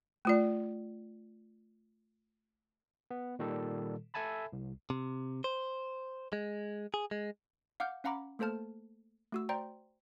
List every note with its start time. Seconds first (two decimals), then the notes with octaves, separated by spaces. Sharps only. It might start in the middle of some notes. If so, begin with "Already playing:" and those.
0.25 A3 F4 D5
3.11 B3
3.39 A#2 D#3 G3 A4
4.14 A4 E5 G#5 A5 B5
4.53 C2
4.90 C3
5.44 C5
6.33 G#3
6.94 G#4
7.11 G#3
7.80 F5 F#5 D6 F6 G6
8.04 C#4 F5 F#5 A#5 B5 D6
8.39 A3 A#3 A4 C5 A5 F6
9.32 A3 F#4 E6
9.49 C5 D5 G5 A#5 C6